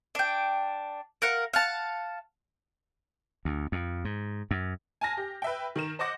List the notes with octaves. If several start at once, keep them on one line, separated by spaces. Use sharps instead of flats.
D4 G5
A#4 F5 F#5
F5 F#5 A5
D2
F2
G#2
F#2
G#5 A5 F6 A#6
G4
B4 E5 G5
D#3 A#4 E7
C5 D#5 F#5 D6 A#6